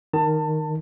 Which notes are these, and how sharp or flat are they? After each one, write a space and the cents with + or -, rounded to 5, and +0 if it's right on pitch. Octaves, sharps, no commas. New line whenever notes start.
D#3 -5 A5 +25